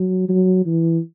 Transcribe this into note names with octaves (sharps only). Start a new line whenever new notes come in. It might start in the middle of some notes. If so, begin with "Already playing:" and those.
Already playing: F#3
F#3
E3